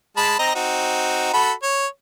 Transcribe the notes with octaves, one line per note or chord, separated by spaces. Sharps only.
G#3 A5 B5
C4 D#5 A#5
C4 D#4 F#4
F#4 A4 B5
C#5